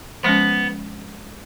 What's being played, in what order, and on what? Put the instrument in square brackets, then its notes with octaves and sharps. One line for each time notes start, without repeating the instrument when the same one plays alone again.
[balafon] F3 G#3 C#4 [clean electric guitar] B3